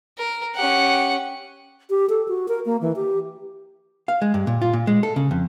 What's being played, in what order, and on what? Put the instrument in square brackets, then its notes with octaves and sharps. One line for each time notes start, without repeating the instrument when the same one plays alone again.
[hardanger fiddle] A#4
[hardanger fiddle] C#4 G4 [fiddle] F#5
[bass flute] G4
A4
F#4
A#4
A#3
E3
G4
[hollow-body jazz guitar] F5
G#3
G2
A#2
F4
A#2
G#3
A4
C#3
F2